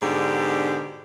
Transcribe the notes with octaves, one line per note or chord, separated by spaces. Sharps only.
G#2 B2 D3 D4 G4